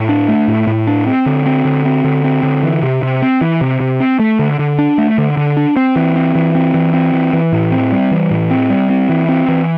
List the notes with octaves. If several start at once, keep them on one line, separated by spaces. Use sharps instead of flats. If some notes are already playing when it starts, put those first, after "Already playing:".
Already playing: A2
D4
A3
A2
A2
D4
C4
D3
C4
D3
C4
D3
C4
D3
E3
C3
C3
C4
E3
C3
C3
C4
A3
D3
D3
D4
A3
D3
D3
D4
C4
E3
C4
E3
C4
E3
C4
E3
E3
A2
C4
G3
E3
A2
C4
G3
C4
E3
C4
E3